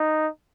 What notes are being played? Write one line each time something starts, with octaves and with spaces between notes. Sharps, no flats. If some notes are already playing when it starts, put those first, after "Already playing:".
Already playing: D#4